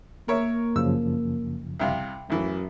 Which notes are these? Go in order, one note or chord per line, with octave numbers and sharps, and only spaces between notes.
A#3 A#4 C#5 E5
F#2 C#3 F3 E6
C2 C3 F5
A1 F#2 E3